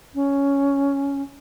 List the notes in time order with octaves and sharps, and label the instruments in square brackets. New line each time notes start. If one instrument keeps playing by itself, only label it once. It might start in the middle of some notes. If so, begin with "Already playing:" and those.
[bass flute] C#4